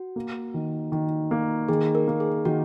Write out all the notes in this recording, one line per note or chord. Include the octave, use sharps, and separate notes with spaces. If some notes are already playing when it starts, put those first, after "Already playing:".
Already playing: F#4
A#3
D#3
D#3
A#3
D#3 G#4
A#4
A#3
G#4
D#3 F#4